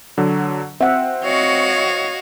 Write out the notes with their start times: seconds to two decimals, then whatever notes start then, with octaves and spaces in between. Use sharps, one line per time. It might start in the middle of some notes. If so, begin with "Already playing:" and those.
0.18 D3 F#3
0.81 C4 E5 F#5
1.24 F#4 C#5 D#5 F5